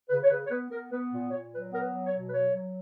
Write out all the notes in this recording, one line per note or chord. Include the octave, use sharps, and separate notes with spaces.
C#3 B4
C#5
C#3 B4
C#5
B3 B4
B3 A#4
B3 B4
A#2
A#2 C#5
F#3 B4
B3 A#4
B4
F#3
C#5
B2
B4
F#3 C#5
F#3